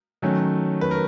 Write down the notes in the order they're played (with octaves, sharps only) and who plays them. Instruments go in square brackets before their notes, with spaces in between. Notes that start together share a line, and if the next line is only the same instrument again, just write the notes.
[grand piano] D#3 F#3 A3 C#4
[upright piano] B4
A#4